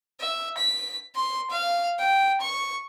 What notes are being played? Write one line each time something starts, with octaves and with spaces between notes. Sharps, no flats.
E5
B6
C6
F5
G5
C#6